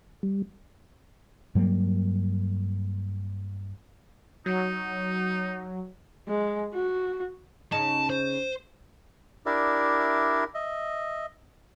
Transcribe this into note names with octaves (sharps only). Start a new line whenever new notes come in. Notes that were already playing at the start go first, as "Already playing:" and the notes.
G3
G2 F#3 G3 A#3
F#3 D#4
G#3
F#4
C#3 C#4 D#4 A5
C5
D4 E4 G4 A#4 D5 E5
D#5 E5